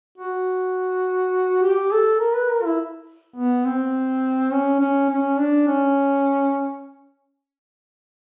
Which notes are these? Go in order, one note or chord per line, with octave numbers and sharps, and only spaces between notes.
F#4
G4
A4
A#4
B4
A#4
E4
B3
C4
C#4
C#4
C#4
D4
C#4